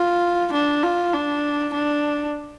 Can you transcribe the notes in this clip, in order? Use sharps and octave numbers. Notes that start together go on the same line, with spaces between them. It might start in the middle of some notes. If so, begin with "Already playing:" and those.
Already playing: F4
D4
F4
D4
D4